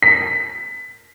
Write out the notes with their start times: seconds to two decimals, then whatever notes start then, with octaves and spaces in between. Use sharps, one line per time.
0.02 B6